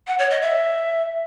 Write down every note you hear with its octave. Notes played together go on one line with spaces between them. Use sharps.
F#5
C#5
D#5
E5